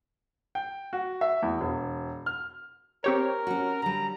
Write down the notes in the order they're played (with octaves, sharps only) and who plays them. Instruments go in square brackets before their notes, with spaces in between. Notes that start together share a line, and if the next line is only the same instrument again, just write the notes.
[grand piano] G5
F#4
E5
E2
E1
F6
[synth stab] C4 G4 C#5 [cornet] A#4
[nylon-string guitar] C#4 F#4
[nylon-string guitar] D3 G3 [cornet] A#5